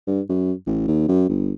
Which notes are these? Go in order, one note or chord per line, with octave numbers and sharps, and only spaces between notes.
G2
F#2
A1
D#2
F#2
G1